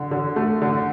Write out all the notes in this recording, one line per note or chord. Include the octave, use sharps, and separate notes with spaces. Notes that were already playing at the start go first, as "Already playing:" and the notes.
Already playing: D3
D3
A3
D3